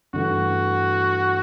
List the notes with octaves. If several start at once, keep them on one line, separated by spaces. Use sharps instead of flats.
G2 E3 A3 F#4